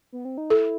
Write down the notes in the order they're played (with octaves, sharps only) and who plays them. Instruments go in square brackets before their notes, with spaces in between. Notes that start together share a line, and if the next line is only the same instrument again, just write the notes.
[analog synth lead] B3
C4
D#4
[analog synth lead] E4 [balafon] A4